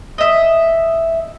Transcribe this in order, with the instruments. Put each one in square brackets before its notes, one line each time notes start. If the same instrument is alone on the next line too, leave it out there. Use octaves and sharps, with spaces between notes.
[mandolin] D#5 E5